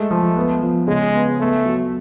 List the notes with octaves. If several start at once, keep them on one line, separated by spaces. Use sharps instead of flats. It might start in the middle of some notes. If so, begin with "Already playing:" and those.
Already playing: G#3 A3
F3
B3
F3
C#3 G#3
B3
A3 B3
F#3